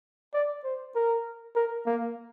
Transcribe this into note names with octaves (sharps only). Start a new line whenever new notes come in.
D5
C5
A#4
A#4
A#3